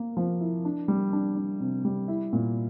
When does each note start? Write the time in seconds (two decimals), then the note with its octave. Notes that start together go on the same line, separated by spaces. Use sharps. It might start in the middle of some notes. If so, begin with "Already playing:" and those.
Already playing: A#3 A#4
0.17 F3
0.40 E4
0.65 D4
0.88 G3
1.13 D4
1.36 D4
1.60 C3
1.85 G3
2.08 E4
2.33 A#2